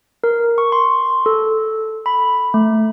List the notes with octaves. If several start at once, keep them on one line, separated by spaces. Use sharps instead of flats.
A#4
C#6
C6
A4
B5
A3